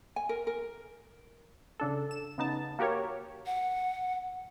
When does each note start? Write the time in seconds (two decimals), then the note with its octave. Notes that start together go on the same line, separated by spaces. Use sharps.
0.16 G#5
0.29 A#4
0.47 A#4
1.80 C#3 D4 A4
2.11 E7
2.38 C#3 B3 D#4 A5
2.79 A#3 F#4 G4 A#4 C#5
3.46 F#5